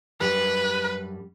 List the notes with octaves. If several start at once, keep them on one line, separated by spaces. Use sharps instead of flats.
F#2 G3 B4